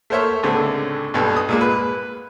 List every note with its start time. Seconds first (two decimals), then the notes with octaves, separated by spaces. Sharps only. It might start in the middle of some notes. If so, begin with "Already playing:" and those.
0.10 A3 A#4 C5 C#5 E5 C#6
0.43 C#2 A2 D3 C4
1.14 B1 G2
1.36 D#6
1.49 A#2 G#3 A#3
1.61 B4